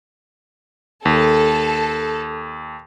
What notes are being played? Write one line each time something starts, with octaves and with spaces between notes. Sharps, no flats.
D#2 A4